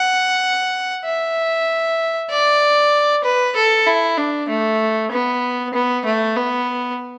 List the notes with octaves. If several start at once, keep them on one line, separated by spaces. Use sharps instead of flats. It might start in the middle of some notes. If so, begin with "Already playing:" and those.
Already playing: F#5
E5
D5
B4
A4
E4
D4
A3
B3
B3
A3
B3